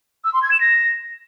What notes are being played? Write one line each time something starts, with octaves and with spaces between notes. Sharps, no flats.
E6
C6
G#6
E7
A#6